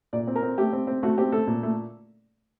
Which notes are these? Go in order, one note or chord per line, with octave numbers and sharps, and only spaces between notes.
A#2 D5
C4
A#4
C4
A3 G4
C4
C4
A3 F#4
C4 G4
A3 A4
A#2
A3